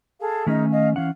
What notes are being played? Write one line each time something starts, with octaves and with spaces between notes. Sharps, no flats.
G#4 A4 F5
D#3 A3 C#4 D#4 G#4 A#4
D#5 F5 G#5
E3 C#4 F5 F#5